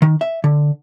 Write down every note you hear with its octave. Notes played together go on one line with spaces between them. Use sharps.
D#3
E5
D3